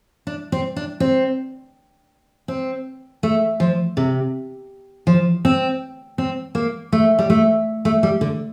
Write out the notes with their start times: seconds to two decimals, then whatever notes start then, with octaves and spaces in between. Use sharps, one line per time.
0.27 D4
0.52 C4
0.76 D4
1.00 C4
2.48 C4
3.23 A3
3.60 F3
3.97 C3
5.07 F3
5.45 C4
6.18 C4
6.55 A#3
6.92 A3
7.19 G3
7.30 A3
7.85 A3
8.03 G3
8.21 D3